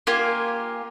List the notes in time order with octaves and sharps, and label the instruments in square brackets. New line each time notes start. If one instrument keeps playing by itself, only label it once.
[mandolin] A#3 F4 G4 G#5